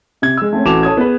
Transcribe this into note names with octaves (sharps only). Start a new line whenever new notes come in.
C3 G#6
G#3 E6
A3 C4 C#4
A1 F#4 A4 D6 E7 F7
A4 C#5 D#6 G#6
B3 G#4 B4